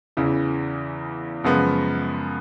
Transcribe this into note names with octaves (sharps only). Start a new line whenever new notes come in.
E2 C#3 E3
F#2 C#3 F3 G#3 B3